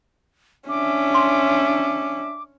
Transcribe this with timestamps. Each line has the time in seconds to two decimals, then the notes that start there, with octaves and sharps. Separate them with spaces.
0.69 C#4 D4 E5 D6
1.14 C6